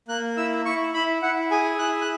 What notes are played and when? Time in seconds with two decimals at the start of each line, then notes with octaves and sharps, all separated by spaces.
0.08 A#3 F#6
0.37 E4 E6
0.65 E4 C#6
0.94 E4 B5
1.22 E4 F#5
1.51 G#4 G#5
1.79 E4 F#6
2.02 F#6